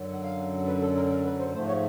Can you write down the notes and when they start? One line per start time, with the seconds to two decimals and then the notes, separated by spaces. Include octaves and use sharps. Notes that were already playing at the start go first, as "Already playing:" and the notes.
Already playing: F#2 D3 F#3
0.13 F#5
0.23 F5
0.67 B4
0.81 A4
0.96 A#4
1.10 A#4
1.25 B4
1.39 C5
1.54 G#2 F3 A3 C5
1.68 C#5